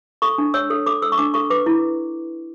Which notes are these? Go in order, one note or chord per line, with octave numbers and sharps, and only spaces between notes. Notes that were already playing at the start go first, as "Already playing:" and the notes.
A4 C#6
D4
C#5 E6
A4
A4 D6
A4 E6
C#6
D4 D6
A4 C#6
B4 D6
E4